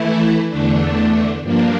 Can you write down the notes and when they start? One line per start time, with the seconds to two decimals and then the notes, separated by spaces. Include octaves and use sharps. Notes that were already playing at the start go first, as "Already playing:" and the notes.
Already playing: E3 A3 E4
0.49 E2 D3 A3 D4
1.42 G2 F3 A#3 D4